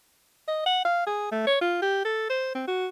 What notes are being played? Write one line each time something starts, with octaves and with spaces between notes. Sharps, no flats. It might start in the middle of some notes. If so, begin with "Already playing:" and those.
D#5
F#5
F5
G#4
A3
C#5
F4
G4
A4
C5
C4
F#4